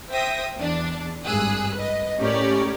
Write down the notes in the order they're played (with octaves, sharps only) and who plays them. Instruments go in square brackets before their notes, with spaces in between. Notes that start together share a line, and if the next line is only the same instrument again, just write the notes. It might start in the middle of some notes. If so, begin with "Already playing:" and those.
[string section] C5 E5 G5 D#6 A#6
E2 D4
G#1 G2 G#4 D#6 E6 F#6
B4 D#5
A2 C#4 G4 A#4 C#5 D5